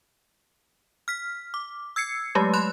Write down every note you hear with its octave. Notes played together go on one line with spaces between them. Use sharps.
F6 B6
D6
E6 G#6 C7 C#7
F#3 G#3 A3 G4
B5 C6 F#6